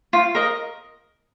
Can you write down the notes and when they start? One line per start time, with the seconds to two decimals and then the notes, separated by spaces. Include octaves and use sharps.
0.13 F4
0.35 A#4 D#5